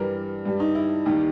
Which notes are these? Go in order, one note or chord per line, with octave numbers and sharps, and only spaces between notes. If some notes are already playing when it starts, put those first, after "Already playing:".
Already playing: G2 E3 G3 A#4
G2 G3
D#4
E4
D#2 D#3 G3